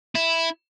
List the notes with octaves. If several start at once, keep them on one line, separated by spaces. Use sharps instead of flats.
E4